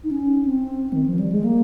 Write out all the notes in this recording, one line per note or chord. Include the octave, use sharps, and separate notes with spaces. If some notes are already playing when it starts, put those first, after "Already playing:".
D#4
C#4
C4
D#3
F3
G3
G#3
A#3